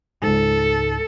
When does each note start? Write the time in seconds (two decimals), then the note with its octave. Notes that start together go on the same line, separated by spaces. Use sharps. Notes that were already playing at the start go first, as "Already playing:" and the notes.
0.23 C#2 G#2 A4